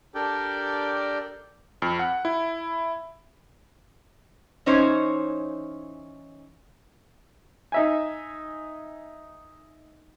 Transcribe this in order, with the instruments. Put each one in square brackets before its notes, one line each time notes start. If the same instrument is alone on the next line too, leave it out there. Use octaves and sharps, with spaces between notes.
[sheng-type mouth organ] D4 G4 A4 A#4 D5 G5
[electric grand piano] F2
F#5
E4
[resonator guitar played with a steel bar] E3 C#4 D#4 C5 C#5
[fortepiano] D#4 E5 G#5